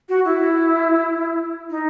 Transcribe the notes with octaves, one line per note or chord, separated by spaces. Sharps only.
F#4
E4
D#4